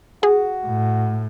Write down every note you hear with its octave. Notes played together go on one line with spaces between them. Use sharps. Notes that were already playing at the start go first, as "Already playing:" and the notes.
F#4 G#4
A2